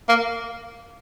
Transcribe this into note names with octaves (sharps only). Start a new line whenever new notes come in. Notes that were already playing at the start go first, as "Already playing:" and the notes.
A#3